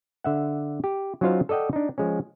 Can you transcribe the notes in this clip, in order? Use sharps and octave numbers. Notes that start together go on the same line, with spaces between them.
D3 E5 F#5
G4
F#3 C#4 D#4 F4 C5 F5
A4 D5 D#5 F#5 G5
D4 D#4
F3 G#3 C#4